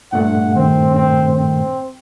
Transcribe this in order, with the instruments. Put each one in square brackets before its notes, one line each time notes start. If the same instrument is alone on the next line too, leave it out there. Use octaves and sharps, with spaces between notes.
[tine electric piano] G2 A#2 A3 [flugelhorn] F#5
[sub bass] D#3 [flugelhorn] C4
[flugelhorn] C4
C4